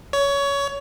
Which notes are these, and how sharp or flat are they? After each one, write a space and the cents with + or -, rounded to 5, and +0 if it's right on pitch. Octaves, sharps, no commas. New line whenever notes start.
C#5 +20